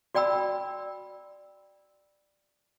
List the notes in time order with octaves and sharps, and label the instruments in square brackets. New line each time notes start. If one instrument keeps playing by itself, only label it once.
[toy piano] F#4 D5 G5 B5 E6